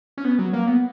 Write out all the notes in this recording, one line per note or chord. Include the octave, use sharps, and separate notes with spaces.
C#4
B3
F#3
A#3
B3